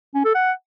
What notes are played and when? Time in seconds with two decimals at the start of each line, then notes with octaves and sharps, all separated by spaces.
0.15 C#4
0.25 A4
0.35 F#5